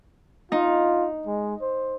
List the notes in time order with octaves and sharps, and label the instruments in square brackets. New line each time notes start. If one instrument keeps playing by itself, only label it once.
[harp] D#4 [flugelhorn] F4
[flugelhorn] G#3
C5